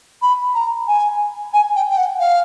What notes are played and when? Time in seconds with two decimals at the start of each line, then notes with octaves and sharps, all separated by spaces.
0.22 B5
0.54 A#5
0.87 G#5
1.53 G#5
1.75 G5
1.90 G5
1.97 F#5
2.19 F5